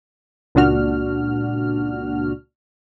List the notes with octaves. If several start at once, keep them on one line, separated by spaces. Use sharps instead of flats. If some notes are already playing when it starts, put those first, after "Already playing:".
C#2 A#2 D4 F#4 F6